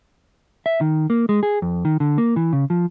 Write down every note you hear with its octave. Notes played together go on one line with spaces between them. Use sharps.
E5
D#3
A#3
G#3
G#4
F2
D#3
D3
A#3
E3
C#3
F3